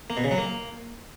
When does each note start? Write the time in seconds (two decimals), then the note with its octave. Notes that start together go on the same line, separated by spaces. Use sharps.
0.10 A#3
0.17 B2
0.24 C#3
0.31 F#3
0.38 A#3